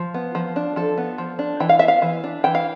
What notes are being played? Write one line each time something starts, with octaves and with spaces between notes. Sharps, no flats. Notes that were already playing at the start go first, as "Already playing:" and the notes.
Already playing: F3
B3
F3
D4
F3 A4
B3
F3
D4
E3 G5
F5
B3 E5
F5
E3
D4
E3 G5
F5